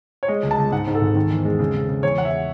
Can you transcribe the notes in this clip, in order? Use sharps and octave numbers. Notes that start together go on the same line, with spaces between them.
C#5
G#3 D#5
C#2
A5
C#2
G#2 F#5
G#2
A4
G#1
D#3
E2
G#3
C#3
C#3
C#3
E2 C#5
E2 F#5
E5